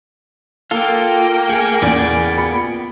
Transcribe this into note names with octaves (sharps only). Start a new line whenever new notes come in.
A#3 F4 A4 F5 G5
A3 G#4 C#7
E2 C#3 B3 G#4 D5
F4 B5 C#7